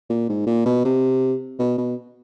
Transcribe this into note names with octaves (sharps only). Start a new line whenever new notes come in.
A#2
G#2
A#2
B2
C3
B2
B2